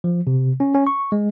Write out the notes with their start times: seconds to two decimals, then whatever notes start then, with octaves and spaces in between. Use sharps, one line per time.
0.04 F3
0.27 C3
0.60 C#4
0.75 C#4
0.87 C#6
1.12 G#3